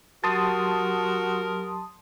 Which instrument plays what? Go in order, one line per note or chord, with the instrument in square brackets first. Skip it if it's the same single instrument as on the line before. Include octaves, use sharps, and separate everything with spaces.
[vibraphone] F#3 G4 [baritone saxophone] F#4 [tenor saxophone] A#4 [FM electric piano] A5 C6 D#6